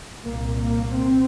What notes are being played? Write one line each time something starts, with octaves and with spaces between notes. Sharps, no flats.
C2 A#2 A#3
A#3
C4